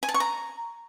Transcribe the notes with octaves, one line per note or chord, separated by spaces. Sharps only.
G#5
A5
C#6
A#5